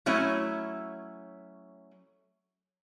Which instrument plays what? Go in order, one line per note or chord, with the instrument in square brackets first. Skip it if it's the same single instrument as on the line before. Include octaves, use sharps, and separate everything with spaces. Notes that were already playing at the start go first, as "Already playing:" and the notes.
[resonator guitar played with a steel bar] F#3 A3 C#4 E4